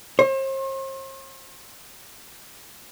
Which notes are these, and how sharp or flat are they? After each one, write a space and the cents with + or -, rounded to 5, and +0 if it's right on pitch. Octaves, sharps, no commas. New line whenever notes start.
C5 +45